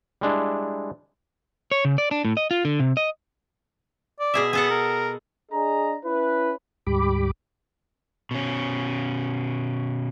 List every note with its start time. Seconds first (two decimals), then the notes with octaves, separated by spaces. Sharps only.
0.21 G3 G#3 D4 E4
1.72 C#5
1.85 C#3
1.98 D5
2.11 D4
2.25 A2
2.37 D#5
2.51 F4
2.65 D3
2.80 C3
2.97 D#5
4.20 D5
4.34 B2 G#4 E5
4.53 B3 G#4 A4 F#5
4.70 A#4
5.52 D4 G#4 D#5 A#5
6.05 C#4 E4 B4
6.87 D2 G#2 G3 G4 B5 D6
8.31 B2 C#4